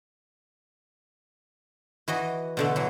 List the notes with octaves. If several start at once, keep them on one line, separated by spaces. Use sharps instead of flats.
E3 F#4 D#5
B2 D3 A3
E3 F#3